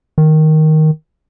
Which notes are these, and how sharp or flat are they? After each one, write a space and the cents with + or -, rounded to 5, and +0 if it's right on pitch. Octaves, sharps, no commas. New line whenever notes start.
D#3 +5